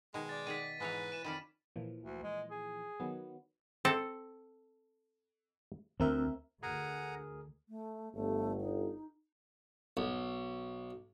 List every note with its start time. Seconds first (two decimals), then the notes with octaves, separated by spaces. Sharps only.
0.14 B2 D#3 G#3
0.29 D5 A6
0.47 D#3 G#4 F#5 B6 D#7
0.80 G#2 B2 E3 B4 C#5
1.12 E3 D#7 E7
1.24 F2 D#3 C#4 D5 B5
1.76 A#2 E3 F3
2.04 D2
2.23 G#3
2.51 G#4
3.00 D#3 F#3 B3
3.85 C4 A4
6.00 D2 C4 A#4 E5
6.63 D2 G#4 A#4 F#5 G#5 A#5
7.69 A3
8.14 G1 A3
8.61 D#4
9.97 B1